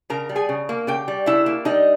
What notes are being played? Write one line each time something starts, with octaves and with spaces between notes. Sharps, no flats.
C#3 A#4 A#5
G3
G#4 G#5
C#3
A#3
C#3 G4 G5
G3
C#3 E4 E5
A#3
G3 D#4 D#5